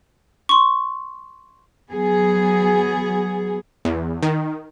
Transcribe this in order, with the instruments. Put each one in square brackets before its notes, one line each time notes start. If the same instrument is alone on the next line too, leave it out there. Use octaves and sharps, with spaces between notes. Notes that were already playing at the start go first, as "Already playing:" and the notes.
[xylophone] C6 C#6
[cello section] F#3 B3 G#4
[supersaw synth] E2
D#3